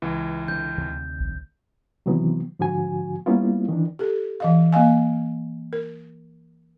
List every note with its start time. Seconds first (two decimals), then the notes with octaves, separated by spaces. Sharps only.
0.02 C#2 E3
0.48 D3 G6
0.78 D2 C3 D#3
1.20 A#1
2.06 C3 D#3 E3 F#3 B3
2.59 G#2 D3 F3 F#4 G#5
3.26 G3 A#3 B3 C#4 E4 F4
3.69 D#3 E3 D4
3.99 G4 A4
4.40 E3 D#5 F5
4.73 A#3 D#5 F5 G#5
5.73 A#4